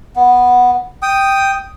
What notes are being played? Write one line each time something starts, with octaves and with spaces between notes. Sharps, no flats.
B3
G5 D#6